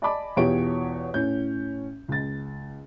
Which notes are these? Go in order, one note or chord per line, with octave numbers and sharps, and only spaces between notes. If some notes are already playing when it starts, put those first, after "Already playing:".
D5 D#5 G#5 A5 B5 D6
E2 B2 F4 G4 C#5 D7
A2 C#4 G6
C#2 A6